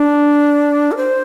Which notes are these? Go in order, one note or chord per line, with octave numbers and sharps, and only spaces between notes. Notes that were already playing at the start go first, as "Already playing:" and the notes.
Already playing: D4
A#4
C5